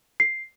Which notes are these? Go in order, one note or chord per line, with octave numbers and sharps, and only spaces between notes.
C7